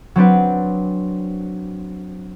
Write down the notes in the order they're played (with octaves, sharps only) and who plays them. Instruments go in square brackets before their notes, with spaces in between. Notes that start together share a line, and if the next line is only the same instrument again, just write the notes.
[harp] F#3 C4 D4 B4